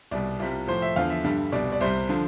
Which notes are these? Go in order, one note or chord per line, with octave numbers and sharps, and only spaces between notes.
C2 B2 G3 D5
C2 C3 G3 F4
A2 F3 C5
E5
E2 D3 F3 F5
E5
G2 D3 G3
C2 B2 G3 D5
D5
C2 C3 G3 C5
D3 F3